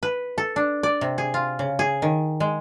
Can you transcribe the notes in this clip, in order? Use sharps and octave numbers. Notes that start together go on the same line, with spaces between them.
B4
A4
D4
D5
C3
G#4
F4
C#3
G#4
D#3
G#3